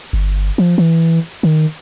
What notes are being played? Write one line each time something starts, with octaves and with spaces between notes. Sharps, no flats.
G1
F3
E3
D#3